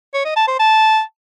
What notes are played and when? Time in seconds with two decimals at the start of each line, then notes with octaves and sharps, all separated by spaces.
0.14 C#5
0.25 D#5
0.36 A5
0.48 C5
0.59 A5